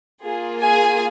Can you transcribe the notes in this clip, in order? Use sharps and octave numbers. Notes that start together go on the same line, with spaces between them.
A#3 F4 G#4
G#4 G#5